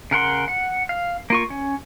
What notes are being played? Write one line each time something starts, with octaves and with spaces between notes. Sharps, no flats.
C#3 A#4 F#5 C6
F#5
F5
A#3 F4 C#6
C#4